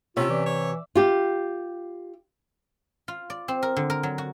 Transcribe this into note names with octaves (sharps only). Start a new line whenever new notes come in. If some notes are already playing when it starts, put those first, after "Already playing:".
C3 C#4 F4 G4 E5
E3 D5
C#5
F4 G4
F4
D5
C4
A#4
D3
A#4
F#3
F#4